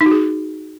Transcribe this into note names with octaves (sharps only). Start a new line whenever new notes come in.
D#4
F#4
G#4